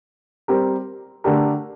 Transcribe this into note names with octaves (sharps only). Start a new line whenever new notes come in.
G3 C4 G4 A#4
D3 A3 D4 G4 A#4